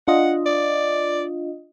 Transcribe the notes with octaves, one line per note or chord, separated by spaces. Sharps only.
D4 F4 D#5 F#5
D5